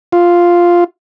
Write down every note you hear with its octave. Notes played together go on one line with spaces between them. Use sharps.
F4